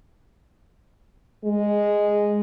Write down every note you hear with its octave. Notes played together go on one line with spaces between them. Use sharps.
G#3